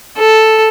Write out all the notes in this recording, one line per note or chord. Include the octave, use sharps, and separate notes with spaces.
A4